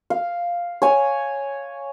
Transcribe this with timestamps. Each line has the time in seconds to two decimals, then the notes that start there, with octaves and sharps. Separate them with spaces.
0.10 F5
0.82 C#5 G#5